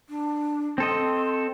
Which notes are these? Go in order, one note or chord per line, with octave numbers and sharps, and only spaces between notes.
D4
C4 A4 D#5 C6